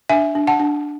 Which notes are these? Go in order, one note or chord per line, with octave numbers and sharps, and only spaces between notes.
D4 E5 G#5
D4
F#5 A5
D4